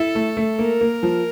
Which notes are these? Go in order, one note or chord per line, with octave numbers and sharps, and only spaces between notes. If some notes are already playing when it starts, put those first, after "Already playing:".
Already playing: E4 A4
A3
A3
A#3 A#4
A#3
F3